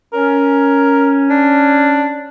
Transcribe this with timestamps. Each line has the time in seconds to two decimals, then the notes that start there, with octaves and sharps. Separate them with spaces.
0.14 C#4 A#4
1.30 D4